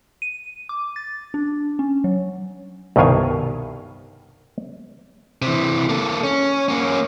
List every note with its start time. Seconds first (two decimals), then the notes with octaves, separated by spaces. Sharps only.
0.22 D#7
0.69 D6
0.96 A6
1.34 D4
1.79 C#4
2.04 F#3
2.96 C2 G2 B2 D#3 F5 G#5
5.42 C3 E3
5.89 A#3 A4
6.23 C#4
6.68 A#3 C#4